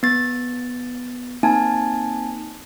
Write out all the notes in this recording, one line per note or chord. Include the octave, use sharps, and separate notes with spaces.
B3 A6
A#3 C4 D#4 G#5 A5